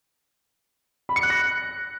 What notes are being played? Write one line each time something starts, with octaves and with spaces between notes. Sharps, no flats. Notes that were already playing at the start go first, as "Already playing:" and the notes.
B5
C#7
F#6
A#6